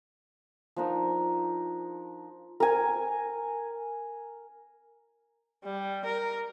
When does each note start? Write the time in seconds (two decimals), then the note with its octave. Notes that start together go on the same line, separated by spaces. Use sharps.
0.76 F3 D4 D#4 A#4
2.60 A#4 G#5
5.64 G3
6.05 A#4